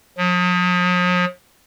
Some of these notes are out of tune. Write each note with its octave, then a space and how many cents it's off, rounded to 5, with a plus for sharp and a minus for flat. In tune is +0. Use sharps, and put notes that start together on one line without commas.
F3 +45